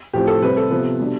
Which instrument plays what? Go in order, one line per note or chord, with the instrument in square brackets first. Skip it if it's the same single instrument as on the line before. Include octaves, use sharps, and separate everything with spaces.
[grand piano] A2 F3 C4 G4
A4
C3 G3 C4 B4
A4
C3 F3 B3
B2 G3 D4